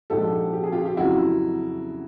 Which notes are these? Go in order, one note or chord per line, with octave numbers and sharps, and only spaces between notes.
A#1 G#2 F3 G#3 G4 A4
G4
G#4
F4 G4
G4
F2 C#3 F#3 E4 F#4